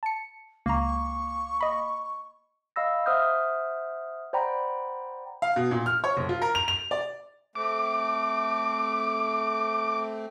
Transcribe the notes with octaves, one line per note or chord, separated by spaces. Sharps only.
A5 C#7
C#2 A#3 A#5 C#6
D#5 B5
D#5 F5 B5 E6 A#6
C5 E5 F#5 D#6 F6 G6
C5 D5 F#5 G5 A#5 B5
F5
B2
A#2
F6
C#5
F#1
F4
A#4
F7
F7
D5
A3 C4 D6